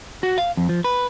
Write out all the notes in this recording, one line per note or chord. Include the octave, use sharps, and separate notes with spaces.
F#4
F5
F2
F3
B4